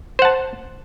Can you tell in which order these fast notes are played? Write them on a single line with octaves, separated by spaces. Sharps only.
C5 F#5 A5